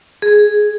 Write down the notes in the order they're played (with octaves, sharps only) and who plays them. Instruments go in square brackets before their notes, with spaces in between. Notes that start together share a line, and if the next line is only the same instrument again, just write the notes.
[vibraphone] G#4